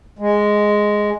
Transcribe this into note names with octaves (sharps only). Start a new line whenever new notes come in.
G#3